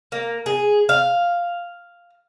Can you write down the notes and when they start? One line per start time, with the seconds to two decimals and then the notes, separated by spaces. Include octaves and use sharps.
0.12 A#3
0.46 G#4
0.89 F5